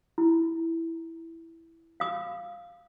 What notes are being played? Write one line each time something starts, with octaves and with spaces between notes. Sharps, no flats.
E4
F5 D#6